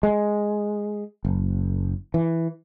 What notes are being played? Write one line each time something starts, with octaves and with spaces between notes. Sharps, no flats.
G#3
F#1
E3